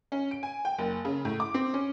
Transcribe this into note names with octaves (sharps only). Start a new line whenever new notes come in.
C#4
D7
G#5
G5
F#1
C#3
A2
D6
C4
C#4